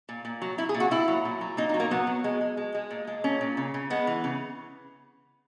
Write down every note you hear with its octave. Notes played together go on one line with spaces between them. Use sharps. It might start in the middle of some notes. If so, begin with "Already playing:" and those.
A#2
A#2
F#3
F#3 E4
G#4
A#2
F#4
A#2 E4
F#3
A#2
F#3
A#2 D#4
D#4
F#3
A#3
F#3 B3
F#3
G#3
G#3
G#3
G#3
A#2
G#3
A#2 C#4
A#2
C#3
C#3
G#3 B3
E3
C#3